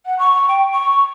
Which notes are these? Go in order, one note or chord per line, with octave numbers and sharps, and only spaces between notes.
F#5
C#6
G5
C#6